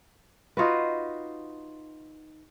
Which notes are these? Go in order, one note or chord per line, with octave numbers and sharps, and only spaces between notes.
D#4 F4 F#4 B4